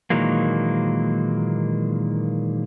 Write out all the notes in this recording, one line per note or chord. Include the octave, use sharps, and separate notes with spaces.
A#2 D#3 E3 F#3 G#3 A#3